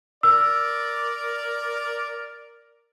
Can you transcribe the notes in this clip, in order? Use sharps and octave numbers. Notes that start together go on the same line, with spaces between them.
A#4 D5 E6